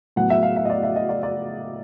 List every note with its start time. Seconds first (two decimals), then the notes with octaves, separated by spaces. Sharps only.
0.16 A2 F#3 B3 F#5
0.30 E5
0.43 F5
0.56 E5
0.65 D#5
0.70 D5
0.83 E5
0.96 D#5
1.09 D5
1.23 D5